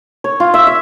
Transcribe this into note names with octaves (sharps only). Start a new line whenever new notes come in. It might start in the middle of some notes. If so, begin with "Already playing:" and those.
C#5
F4
E5
E5